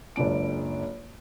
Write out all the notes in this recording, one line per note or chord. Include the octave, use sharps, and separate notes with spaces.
F#1 C#2 D4 D7